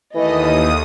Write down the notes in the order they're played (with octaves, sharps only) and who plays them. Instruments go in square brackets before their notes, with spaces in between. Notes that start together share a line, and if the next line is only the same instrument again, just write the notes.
[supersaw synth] D#2 D#6 [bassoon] E3 [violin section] A3 D#5